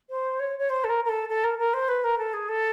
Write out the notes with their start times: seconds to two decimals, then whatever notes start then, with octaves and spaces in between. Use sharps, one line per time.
0.10 C5
0.39 C#5
0.58 C#5
0.70 C5
0.84 A4
0.89 A#4
1.05 A#4
1.09 A4
1.29 A4
1.44 A#4
1.58 A#4
1.74 C5
1.88 B4
2.04 A#4
2.18 A4
2.33 G#4
2.48 A4